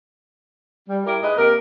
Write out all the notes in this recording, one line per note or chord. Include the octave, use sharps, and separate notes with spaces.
G3
G3 E4 G4 A#4
G#2 G#3 B4 D#5
C3 A#3 A#4